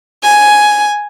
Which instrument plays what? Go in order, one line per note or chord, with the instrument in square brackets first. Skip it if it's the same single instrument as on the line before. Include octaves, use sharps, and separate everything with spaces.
[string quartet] G#5